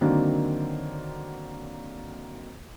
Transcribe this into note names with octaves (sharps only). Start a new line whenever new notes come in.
D3 D#3 F#3 A#3 C4 D4